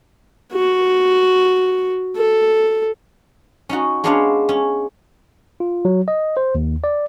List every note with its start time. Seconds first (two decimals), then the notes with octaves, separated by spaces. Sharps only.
0.53 F#4
2.17 A4
3.69 C#4 D#4 F#4
4.04 G#3 B3 C#4 D4 C#5 F5
4.49 C#4
5.60 F4
5.85 F#3
6.08 D#5
6.37 C5
6.55 D#2
6.84 D5